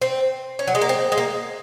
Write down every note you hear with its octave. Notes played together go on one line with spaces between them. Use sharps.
C4
C#4
F#3
G#3
A#3
C4
G#3
A#3